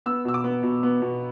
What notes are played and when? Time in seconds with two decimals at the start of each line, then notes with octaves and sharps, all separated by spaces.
0.06 B3 E6
0.25 B2 E6
0.34 D6
0.44 B3
0.63 B2
0.83 B3
1.02 B2